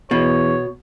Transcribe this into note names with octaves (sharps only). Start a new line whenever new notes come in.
E2 B2 C#5